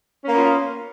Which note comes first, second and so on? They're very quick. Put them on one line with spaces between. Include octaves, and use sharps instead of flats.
C#4 A#3 B3 F4